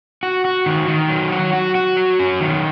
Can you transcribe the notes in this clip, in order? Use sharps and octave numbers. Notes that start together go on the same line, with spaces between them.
F#4
F#4
D#3
D#3
F#3
F#4
F#4
F#4
F#3
C#4
D#3